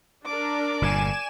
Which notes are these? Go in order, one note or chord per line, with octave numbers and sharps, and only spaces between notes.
D4 A#4 D5 D6
G1 A#2 G#5 E7